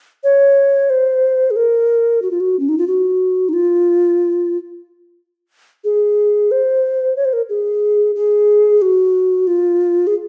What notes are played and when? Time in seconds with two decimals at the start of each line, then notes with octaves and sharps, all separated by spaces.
0.24 C#5
0.90 C5
1.51 G#4
1.56 A#4
2.22 F#4
2.31 F4
2.40 F#4
2.60 C#4
2.69 D#4
2.78 F4
2.87 F#4
3.49 D#4
3.53 F4
5.84 G#4
6.51 C5
7.17 C#5
7.25 C5
7.33 A#4
7.49 G#4
8.16 G#4
8.82 F#4
9.47 F4
10.07 G#4